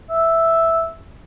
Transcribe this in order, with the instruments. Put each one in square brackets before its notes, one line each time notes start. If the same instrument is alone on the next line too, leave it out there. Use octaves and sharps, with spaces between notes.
[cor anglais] E5